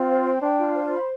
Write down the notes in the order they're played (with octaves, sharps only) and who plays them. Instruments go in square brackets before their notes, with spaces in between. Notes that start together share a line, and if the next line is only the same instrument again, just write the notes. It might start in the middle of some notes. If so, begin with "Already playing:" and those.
Already playing: [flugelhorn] C4 [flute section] F4
[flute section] C5
G5
[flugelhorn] D4 [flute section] G5
[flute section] F4
C5
B5